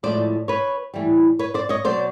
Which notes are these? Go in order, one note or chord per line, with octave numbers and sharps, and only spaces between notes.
A2 F3 G#3 C5 D5
B4 C#5
A2 E3 G3
B4 C#5
C5 D5
C#5 D#5
B2 F#3 C5 D5